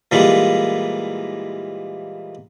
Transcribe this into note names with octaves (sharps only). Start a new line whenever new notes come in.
A#2 E3 G3 G#3 A#3